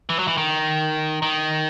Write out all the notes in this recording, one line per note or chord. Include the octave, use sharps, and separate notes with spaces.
E3
F#3
E3
D#3
D#3